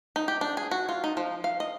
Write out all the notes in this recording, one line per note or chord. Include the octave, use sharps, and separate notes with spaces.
D#4
G4
D4
G#4
F#4
F4
D#4
F3
F5
D#5